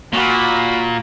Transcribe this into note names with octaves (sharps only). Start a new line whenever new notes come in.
A#2 F#4 B5